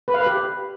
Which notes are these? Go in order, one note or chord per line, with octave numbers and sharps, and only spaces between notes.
B4
F5
B4
G4